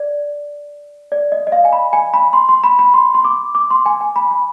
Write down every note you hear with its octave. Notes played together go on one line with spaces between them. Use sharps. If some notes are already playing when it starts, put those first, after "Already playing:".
Already playing: D5
D5
D#5
D#5
F5
G#5
B5
G#5
B5
C6
C6
B5
B5
C6
C6
D6
D6
C6
G#5
G#5
B5
B5